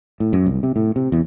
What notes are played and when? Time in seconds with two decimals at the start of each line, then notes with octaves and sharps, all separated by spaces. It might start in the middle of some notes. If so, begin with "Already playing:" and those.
0.20 A2
0.33 F#2
0.46 C2
0.63 C3
0.76 A2
0.96 C3
1.12 E2